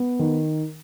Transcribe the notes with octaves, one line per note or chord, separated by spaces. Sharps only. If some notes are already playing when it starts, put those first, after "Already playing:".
Already playing: B3
D#3